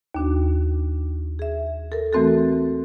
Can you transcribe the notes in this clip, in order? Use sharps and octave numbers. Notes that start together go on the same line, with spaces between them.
D#2 D4 F#4
G#4 E5
A4 A#4
E3 A3 C4 F#4 A4